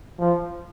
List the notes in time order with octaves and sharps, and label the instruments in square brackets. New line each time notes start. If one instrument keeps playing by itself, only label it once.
[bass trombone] F3